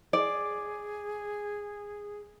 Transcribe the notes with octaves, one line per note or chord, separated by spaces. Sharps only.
G#4 D5